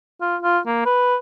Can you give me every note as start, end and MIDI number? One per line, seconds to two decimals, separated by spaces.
0.21 0.36 65
0.43 0.58 65
0.66 0.81 58
0.85 1.16 71